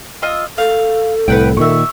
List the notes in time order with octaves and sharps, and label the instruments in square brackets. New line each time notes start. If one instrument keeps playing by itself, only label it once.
[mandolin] F4 D#5 E6
[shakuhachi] A4 [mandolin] F5
[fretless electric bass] C2 A2 [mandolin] B4 F#5 G5
[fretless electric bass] A#2 D#3 [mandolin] E5 C#6